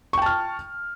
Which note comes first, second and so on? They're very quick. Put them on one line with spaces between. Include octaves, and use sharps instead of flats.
C#6 G5 A5 F6